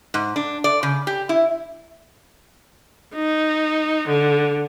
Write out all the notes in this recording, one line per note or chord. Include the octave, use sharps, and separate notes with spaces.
G#2
D4
D5
C#3
G4
E4
D#4
D3